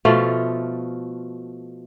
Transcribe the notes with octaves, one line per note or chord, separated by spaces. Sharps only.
B2 F3 A3 F4